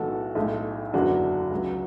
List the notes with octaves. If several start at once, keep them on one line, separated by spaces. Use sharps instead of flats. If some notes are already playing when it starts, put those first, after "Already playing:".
Already playing: B1 A2 E3 G#3 F#4 A4
B1 A2 G#3
F#1 E2 D3 F#3 D4 F#4
C#2 C#3 F#3